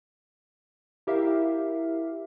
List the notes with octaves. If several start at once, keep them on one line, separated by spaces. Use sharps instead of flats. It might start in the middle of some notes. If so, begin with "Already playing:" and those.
E4 G4 A#4 E5 F5